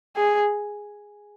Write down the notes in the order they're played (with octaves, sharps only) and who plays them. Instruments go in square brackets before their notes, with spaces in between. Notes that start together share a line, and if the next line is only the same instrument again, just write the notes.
[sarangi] G#4